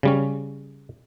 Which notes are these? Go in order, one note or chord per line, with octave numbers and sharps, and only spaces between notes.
C#3 G3 C#4